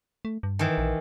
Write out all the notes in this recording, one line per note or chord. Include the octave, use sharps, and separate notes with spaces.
A3
G2
D#3 E3
A#1